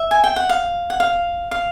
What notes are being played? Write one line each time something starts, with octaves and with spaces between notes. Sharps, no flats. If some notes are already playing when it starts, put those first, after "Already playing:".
Already playing: E5
G#5
G5
F#5
F5
F#5
F5
F5